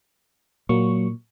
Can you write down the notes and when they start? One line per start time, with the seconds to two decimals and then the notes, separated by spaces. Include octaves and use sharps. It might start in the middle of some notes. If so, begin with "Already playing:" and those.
0.69 A#2 F#3 A#3 C#6